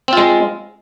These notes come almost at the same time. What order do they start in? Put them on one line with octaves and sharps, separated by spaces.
C4 F4 G#3